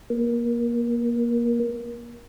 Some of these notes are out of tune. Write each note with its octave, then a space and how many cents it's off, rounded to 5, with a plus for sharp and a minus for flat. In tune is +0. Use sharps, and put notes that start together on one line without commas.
A#3 +25